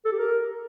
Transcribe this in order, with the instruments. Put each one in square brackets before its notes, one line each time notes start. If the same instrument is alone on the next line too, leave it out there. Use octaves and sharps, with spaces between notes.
[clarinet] A4
G4
A#4